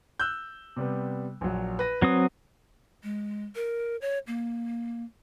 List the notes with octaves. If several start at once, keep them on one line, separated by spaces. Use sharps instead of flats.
E6 F#6 G6
C3 G3 B3
A#1 A#2 F#3
B4 A#6
F#3 C4 D#6
G#3
A#4
C#5
A#3